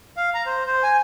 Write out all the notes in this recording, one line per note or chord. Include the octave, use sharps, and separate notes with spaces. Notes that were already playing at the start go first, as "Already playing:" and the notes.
F5
A#5
C5
C5
G#5